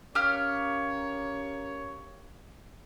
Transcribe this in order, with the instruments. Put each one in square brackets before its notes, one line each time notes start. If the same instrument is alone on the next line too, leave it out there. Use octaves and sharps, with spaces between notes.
[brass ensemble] C#4 A#4 C#5 [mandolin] G4 F5 F6